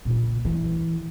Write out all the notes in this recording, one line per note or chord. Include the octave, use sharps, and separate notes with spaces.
A#2 C#3
E3